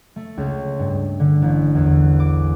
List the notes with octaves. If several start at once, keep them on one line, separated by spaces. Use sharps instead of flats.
A3
C#2
G2
D3
A1
E2
D6